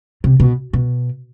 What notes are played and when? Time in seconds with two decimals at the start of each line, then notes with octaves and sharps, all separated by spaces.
0.24 C3
0.40 B2
0.73 B2